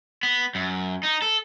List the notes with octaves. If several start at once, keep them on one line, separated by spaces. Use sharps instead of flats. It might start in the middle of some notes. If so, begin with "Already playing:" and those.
B3
F#2
D#4
A4